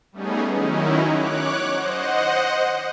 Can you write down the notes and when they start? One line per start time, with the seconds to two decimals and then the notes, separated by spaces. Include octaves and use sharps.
0.12 G3 A3 B3 C#4 D#4 G#4
0.54 D#3 F#3 C#4 D#4 E4
1.09 C#5 D6 F#6
1.69 C5 D#5 F#5